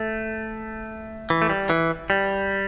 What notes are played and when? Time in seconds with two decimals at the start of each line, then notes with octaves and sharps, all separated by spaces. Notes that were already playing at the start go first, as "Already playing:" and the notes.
Already playing: A3
1.30 E3
1.42 A3
1.49 G3
1.70 E3
2.10 G3